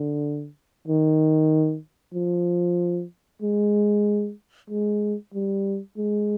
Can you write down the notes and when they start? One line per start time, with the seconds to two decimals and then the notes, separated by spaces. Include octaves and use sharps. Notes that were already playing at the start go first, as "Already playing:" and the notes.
Already playing: D3
0.87 D#3
2.14 F3
3.42 G#3
4.70 G#3
5.34 G3
5.97 G#3